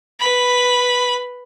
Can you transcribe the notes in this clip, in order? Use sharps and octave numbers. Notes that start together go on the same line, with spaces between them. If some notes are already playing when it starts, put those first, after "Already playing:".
B4 B5